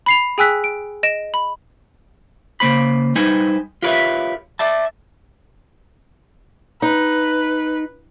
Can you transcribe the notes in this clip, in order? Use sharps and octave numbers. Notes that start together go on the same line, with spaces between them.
B5 C7 F7
G#4 G5 G#5 E6 F#6 B6
D7
D#5 A#6 D7 E7
B5
C#3 A#3 C5 B5
G3 D#4 B4 C5 G#5
F4 G4 A#4 B4 C#5 E5
D5 E5 A5
D#4 B4